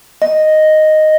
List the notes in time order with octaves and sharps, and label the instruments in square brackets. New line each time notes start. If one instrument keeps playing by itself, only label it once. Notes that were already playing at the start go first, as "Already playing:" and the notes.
[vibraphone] D#5